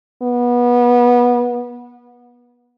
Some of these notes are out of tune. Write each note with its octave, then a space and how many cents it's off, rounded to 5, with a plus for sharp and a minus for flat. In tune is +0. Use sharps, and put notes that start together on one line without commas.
B3 -25